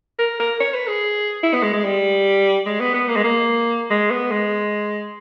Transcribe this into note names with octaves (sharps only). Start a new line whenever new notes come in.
A#4
A#4
C#5
B4
G#4
E4
B3
G#3
G#3
G3
G#3
B3
B3
A#3
G#3
A#3
G#3
B3
G#3